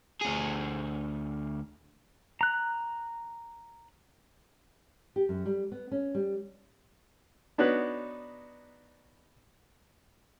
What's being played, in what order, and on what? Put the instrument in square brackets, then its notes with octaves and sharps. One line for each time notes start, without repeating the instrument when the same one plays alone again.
[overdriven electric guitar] D2 G#4
[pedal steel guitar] A#5 F#6
[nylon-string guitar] G4
F#2
G3
B3
C#4
G3
[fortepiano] B3 D4 D#4 F#4 B4 C#5